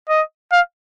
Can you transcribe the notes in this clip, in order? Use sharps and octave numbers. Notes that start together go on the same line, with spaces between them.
D#5
F5